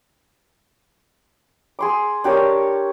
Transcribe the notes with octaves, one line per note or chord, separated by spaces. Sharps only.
G#4 C6 D6
D4 G4 A#4 C#5